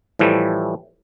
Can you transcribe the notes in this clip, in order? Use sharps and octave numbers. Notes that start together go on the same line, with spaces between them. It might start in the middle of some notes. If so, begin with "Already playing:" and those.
A2 E3 F3 G3 A3